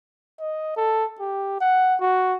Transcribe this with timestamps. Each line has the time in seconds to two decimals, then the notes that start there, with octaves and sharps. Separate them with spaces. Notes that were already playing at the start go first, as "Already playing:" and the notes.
0.40 D#5
0.77 A4
1.20 G4
1.61 F#5
2.01 F#4